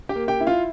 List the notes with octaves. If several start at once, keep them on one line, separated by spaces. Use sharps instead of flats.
G4 G5
A#3
G4 G5
E4
F4 F5